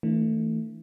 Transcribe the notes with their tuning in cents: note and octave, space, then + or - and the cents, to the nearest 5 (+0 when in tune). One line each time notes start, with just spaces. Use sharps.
E3 -20 A3 +20 D4 +0